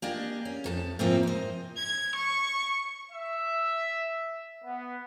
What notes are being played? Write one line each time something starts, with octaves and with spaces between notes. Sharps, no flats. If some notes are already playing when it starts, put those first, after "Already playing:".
A#3 D4 G4 G#4 D5 D#5
C#4
F2 A4 A5
G#2 C3 F3 A#3 C4 E4
C5 D#5
G#6
C#6
E5
B3